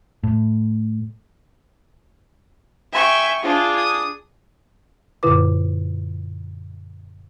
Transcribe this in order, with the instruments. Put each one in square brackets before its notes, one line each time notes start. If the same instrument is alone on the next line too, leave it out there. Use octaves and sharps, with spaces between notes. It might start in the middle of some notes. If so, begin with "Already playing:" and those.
[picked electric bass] A2
[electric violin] E5 G5 [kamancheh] G#5 C#6
[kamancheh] D4 G#4 [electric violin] F4
[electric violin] D#6
[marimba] F#2 A#2 D3 E4 B4 D6